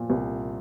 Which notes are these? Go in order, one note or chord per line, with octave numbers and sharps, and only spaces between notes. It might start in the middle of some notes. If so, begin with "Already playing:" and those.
Already playing: A#2 F3
C2